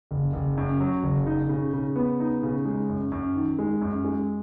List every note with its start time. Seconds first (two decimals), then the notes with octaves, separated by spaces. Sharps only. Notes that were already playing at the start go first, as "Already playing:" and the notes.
0.11 F#1
0.33 F#1
0.58 F#2
0.80 F#3
1.03 F#1
1.26 D#4
1.49 C#3
1.74 C#3
1.96 B3
2.20 D#4
2.43 C#3
2.65 G#3
2.89 F#2
3.12 F#2
3.36 D#3
3.59 G#3
3.81 F#2
4.05 G#3